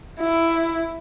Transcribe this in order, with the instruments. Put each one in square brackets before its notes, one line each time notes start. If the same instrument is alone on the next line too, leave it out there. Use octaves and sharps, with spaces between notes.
[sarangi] E4